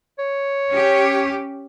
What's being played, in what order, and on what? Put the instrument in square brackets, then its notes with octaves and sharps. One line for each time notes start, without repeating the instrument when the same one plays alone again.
[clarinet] C#5
[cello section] C#4 G4